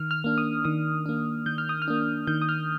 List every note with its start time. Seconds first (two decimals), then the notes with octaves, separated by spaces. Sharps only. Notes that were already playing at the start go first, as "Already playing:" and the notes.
Already playing: D#3 F6
0.11 F6
0.24 A#3 D4
0.38 D#6
0.65 D#3 D#6
1.06 A#3 D4
1.46 D#3 G6
1.58 F6
1.69 D#6
1.82 F6
1.88 A#3 D4
2.27 D#3 G6
2.42 D#6
2.49 F6